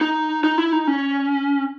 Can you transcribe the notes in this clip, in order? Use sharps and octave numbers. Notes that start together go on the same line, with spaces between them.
D#4
D#4
E4
D#4
C#4